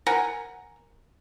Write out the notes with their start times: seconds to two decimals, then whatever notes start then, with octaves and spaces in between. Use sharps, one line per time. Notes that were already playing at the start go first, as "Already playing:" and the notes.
0.07 A#4 F#5 G#5